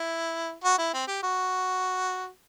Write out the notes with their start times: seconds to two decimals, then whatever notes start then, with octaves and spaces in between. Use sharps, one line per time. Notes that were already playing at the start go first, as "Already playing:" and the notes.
Already playing: E4
0.64 F#4
0.78 E4
0.94 C4
1.08 G4
1.23 F#4